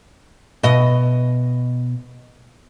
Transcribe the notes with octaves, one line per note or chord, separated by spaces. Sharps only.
B2 D#5